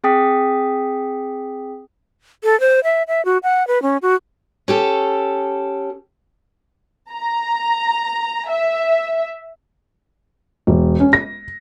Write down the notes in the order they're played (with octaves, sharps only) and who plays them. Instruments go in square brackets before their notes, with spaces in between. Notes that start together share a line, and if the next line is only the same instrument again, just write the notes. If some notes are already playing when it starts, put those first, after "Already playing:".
[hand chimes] C4 G#4 G5 D#6 B6
[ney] A4
C5
E5
E5
F#4
F#5
B4
C#4
F#4
[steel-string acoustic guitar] C#4 G4 A4
[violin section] A#5
E5
[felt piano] E1
C#4
A#6